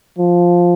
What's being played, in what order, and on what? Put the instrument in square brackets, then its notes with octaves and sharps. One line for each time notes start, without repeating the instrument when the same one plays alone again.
[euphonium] F3